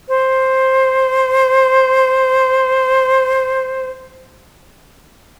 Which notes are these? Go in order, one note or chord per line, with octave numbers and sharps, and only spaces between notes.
C5